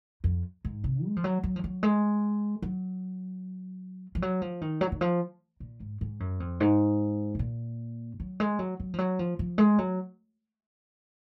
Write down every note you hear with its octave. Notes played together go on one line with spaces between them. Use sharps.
F2
G#2
C3
G#3
F3
F#3
F#3
F3
F#3
G#3
F#3
F3
F#3
F3
D#3
F#3
D#3
F3
A#2
G#2
G#2
F#2
F2
G#2
C3
A#2
F#3
G#3
F#3
F#3
F3
F#3
F3
F3
G#3
F#3